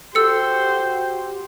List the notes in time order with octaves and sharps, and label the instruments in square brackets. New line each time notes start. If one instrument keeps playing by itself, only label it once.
[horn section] F#4 G4 [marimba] A4 [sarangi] C5 [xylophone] E6 C#7